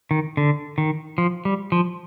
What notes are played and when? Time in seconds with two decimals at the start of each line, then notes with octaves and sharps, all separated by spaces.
0.11 D#3
0.37 D3
0.78 D#3
1.18 F3
1.45 G3
1.72 F3